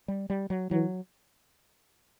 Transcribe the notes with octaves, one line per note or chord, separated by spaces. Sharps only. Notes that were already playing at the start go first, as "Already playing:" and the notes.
G3
G3
F#3
E3 F#3